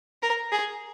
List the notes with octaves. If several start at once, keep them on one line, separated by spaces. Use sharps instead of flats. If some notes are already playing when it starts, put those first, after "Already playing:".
A#4
G#4